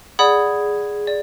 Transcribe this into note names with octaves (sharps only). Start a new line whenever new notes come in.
G#4 D5 F#5 B5 D#6
D5